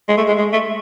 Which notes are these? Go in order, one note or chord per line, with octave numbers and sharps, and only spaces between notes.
G#3
A3
G#3
G#3
A3